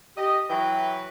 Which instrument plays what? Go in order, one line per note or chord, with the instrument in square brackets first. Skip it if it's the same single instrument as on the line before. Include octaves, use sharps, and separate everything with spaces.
[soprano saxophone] G4 [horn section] D#5
[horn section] E3 F#3 B4 [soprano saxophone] G5